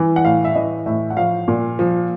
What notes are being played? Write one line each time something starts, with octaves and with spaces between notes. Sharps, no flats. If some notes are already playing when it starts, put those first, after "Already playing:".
Already playing: E3
F#5
A2 F5
E5
E3 D#5
A2 E5
F#5
F3 F5
A#2
F3